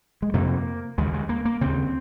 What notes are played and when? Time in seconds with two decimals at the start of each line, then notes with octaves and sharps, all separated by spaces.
0.22 G#3
0.33 F2 C3 A#3
0.98 D#2 C#3 G#3
1.14 G#3
1.29 A#3
1.45 A#3
1.61 D#2 C#3 C4